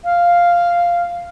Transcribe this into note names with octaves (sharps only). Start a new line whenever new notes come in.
F5